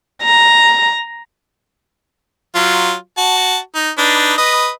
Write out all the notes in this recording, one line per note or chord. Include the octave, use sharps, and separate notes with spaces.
A#5
F#3 F4
F#4 A5
D#4
D4 D#4 B4
B4 D#5